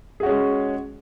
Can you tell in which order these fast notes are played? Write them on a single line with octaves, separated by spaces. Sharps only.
G#4 F#4 C#4 G#3